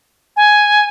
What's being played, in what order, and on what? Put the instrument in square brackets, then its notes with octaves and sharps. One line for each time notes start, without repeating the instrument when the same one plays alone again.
[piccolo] G#5